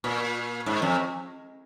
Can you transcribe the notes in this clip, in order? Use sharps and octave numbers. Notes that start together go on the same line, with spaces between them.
A#2
G#2
F2